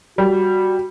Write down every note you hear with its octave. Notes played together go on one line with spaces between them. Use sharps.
G3 F#4